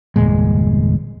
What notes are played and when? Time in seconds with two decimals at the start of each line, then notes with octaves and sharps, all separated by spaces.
0.16 G1 E2 A#2 G#3